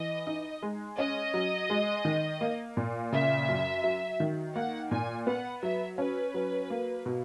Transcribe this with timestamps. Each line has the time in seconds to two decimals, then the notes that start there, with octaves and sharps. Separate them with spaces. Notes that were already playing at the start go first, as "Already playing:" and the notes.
Already playing: E3 D#5
0.27 D#4
0.63 G#3
0.98 C#4 D#5
1.34 F#3
1.70 G#3
2.05 D#3
2.41 A#3
2.77 A#2
3.12 C#3 E5
3.48 F#2
3.84 F#3
4.20 D#3
4.55 A#3 F#5
4.91 A#2 G#5
5.27 B3 F#5
5.63 F#3 E5
5.98 C#4 B4
6.34 F#3
6.70 A#3
7.06 B2